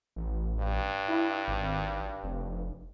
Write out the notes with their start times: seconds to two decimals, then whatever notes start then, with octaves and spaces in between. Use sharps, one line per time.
0.16 A1
0.59 G2
1.08 E4
1.48 G#1
2.24 F1